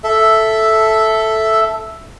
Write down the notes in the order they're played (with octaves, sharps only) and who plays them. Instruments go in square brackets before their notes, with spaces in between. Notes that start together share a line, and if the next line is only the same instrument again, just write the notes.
[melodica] A4 E5